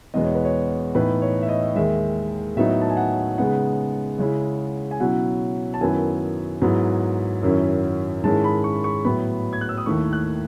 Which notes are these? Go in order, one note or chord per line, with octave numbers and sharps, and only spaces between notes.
E2 B2 G#3 B3 D#5
C#5
B4
C#5
A2 E3 B3 D#4 B4
C#5
E5
D#5
D#2 D#3 G#3 E5
A2 F#3 B3 D#4 E5
A5
G#5
F#5
C#3 G#3 B3 D#4 F#5
C#3 G#3 C#4 E4
G#5
B2 F#3 C#4 E4 F#5
A5
F#2 D#3 F#3 B3 E4 G#5
G#2 F#3 B3 E4
F#2 D#3 F#3 C#4 E4
G#2 D#3 G#3 C#4 E4 A5
B5
C#6
C#6
A2 F#3 B3 B5
G#6
F#6
E6
D#6
D#2 D#3 A3 E4 C#6
F#6